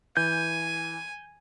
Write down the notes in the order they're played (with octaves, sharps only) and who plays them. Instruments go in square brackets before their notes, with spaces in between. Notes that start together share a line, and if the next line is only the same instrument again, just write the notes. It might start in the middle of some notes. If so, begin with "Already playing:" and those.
[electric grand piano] E3 [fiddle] G#5 [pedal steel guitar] G6